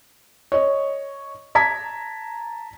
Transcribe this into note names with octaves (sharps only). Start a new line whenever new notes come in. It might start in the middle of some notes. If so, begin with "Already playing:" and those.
C#5 D#5
A5 A#5 G#6 B6